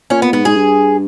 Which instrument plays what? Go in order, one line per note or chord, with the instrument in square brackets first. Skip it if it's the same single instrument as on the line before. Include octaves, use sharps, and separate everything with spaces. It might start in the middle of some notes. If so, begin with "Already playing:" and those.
[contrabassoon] A#2 [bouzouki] C#4
[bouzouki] B3
[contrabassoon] G#2 [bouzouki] B3
[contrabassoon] G#2 [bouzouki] G#4
[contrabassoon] G2